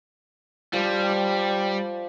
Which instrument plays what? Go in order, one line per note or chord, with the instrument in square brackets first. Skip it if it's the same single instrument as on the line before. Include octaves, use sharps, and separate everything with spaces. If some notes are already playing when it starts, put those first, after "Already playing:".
[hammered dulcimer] F3 [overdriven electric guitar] G3
[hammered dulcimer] G5